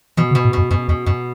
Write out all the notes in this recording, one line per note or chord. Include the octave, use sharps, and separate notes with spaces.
B2 E3
C#3
B2
A2
F#2 B2
F#2 B2
E2 B2
F#2 B2